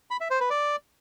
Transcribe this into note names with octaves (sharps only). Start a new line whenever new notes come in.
B5
E5
C5
B4
D5